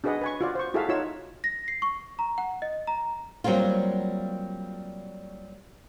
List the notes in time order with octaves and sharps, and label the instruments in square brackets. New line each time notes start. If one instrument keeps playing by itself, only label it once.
[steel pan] D4 F#4 G#4 B4 D#5 F#5
B4 G#5 C#6
F4 F#4 D5
C5 C#6
E4 F#4 G#4 A4 E5 F5
D#4 F4 F#4 C#5 E6
[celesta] A#6
C7
C#6
A#5
F#5
D#5
A#5
[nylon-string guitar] F#3 G3 A#3 C4 F4